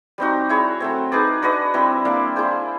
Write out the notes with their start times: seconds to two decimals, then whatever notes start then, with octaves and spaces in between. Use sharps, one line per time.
0.18 G3 C4 D#4 F#4
0.49 E4 G#4 C#5
0.80 F#3 A3 C4
1.12 D#4 G#4 B4 D5
1.42 D4 F#4 B4 D#5
1.74 G3 C4 E4
2.05 G3 A#3 D4
2.36 E4 G#4 C5